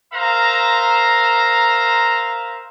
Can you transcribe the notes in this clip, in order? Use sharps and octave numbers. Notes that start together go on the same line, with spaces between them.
A#4 C5 E5 F5 A#5